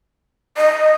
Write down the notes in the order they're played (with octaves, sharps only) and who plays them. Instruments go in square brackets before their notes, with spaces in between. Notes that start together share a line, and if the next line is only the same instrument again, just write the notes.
[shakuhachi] D#5